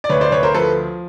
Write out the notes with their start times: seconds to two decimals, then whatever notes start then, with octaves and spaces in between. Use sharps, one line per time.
0.04 D5
0.09 D2 B4 C#5
0.21 C5 D5
0.32 D2 B4 C#5
0.43 A#4 C5
0.54 F3 A4 B4